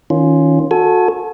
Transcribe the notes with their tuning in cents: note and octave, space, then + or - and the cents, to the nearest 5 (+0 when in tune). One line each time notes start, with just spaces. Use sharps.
D#3 +30 C#4 +5 F4 +0
F#4 -25 A4 +0 G#5 +25